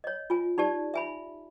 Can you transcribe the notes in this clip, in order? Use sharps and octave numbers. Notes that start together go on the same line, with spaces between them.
C#5 D#5
F4 G#5
D#4 G4 D5 A5
E5 G#5 B5